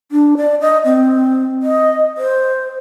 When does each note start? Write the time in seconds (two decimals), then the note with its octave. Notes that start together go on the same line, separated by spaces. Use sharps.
0.12 D4
0.37 D5
0.61 D#5
0.85 C4
1.63 D#5
2.18 C5